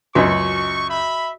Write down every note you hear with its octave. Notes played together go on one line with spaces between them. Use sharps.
C#2 F#2 F#4 D#5 C#6
E5 B5